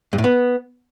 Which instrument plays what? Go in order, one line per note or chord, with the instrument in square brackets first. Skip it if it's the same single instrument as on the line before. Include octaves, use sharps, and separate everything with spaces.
[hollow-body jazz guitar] G2
A2
B3